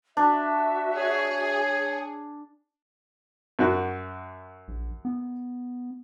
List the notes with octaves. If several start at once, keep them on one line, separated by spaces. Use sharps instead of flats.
D4 F#4 E5
G#4 C#5
F#2 F#4
A#1
B3